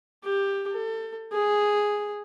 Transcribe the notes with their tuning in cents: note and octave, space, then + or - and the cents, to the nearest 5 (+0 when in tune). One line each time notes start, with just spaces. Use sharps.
G4 +15
A4 +30
G#4 +0